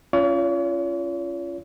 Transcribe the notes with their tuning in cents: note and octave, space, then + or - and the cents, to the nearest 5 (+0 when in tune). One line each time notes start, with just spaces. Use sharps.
C#4 +0 F4 -25 C#5 +45